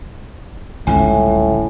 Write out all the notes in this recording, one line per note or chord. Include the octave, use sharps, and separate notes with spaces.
G1 C#2 A2 G#5